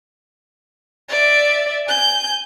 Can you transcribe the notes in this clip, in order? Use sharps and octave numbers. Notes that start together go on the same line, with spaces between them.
D5 E5
G#5 G6